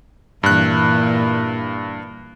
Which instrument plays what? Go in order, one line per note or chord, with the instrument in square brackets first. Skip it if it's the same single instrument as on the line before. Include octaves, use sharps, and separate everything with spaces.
[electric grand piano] G2 F#6 [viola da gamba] A#2 E3